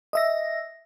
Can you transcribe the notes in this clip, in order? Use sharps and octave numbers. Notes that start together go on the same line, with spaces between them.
D#5 E5 A#6